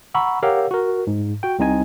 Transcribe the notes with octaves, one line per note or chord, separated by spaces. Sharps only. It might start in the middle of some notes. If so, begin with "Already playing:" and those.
F#5 A#5 B5 C#6 E6
G4 A#4 C#5 F5 F#5 E6
F#4 A#4
G#2
F#4 G5
C2 C3 C4 D#4 D#5 G#5